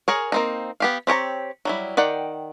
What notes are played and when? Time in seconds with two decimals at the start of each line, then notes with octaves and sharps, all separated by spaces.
0.08 G#4 A#4 C#5
0.32 A#3 C4 D#4
0.80 B3 G4 F5
1.07 C4 G4 C#5 A#5
1.65 F#3 G3 E4
1.97 D#3 D5 F#5 G5